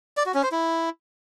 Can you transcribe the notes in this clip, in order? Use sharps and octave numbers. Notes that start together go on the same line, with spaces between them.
D5
F#4
C#4
C5
E4